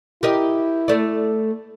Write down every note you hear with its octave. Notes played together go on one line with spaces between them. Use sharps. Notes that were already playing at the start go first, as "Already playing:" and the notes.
E4 G4 A#4 D#5
A3 D5